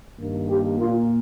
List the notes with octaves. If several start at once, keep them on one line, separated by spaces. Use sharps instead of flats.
G2 D#3 A#3
G4
A#2 A#3 F4